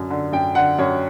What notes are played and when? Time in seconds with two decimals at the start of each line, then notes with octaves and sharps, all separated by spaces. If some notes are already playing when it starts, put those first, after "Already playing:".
Already playing: F#2 D3
0.10 D3
0.33 F#2 G5
0.55 D3 F#5
0.79 F#2 C#5